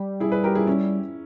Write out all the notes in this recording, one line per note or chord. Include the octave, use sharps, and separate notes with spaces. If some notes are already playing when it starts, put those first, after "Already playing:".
Already playing: G3
E4 G#4
G#4 B4
G4 A#4
E4 G#4
C#4 E4